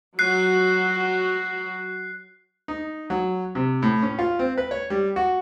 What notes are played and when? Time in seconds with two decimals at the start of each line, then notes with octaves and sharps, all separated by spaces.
0.19 F#3 F#4 F#6 C7
2.68 D#4
3.10 F#3
3.55 C3
3.82 A2
4.02 C#4
4.19 F4
4.39 C4
4.58 B4
4.71 C#5
4.90 G3
5.16 F#4